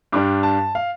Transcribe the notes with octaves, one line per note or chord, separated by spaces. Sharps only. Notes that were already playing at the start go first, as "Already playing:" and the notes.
G2 G3 D4 D6
A5
F5